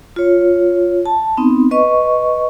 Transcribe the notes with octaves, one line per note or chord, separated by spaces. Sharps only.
F4 C#5
A5
B3 C4 D#4
B4 D#5 C#6